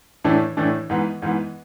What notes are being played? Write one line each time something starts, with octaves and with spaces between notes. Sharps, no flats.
A2 E3 A3 D4
A2 E3 A3 D4
G#2 E3 B3
G#2 E3 B3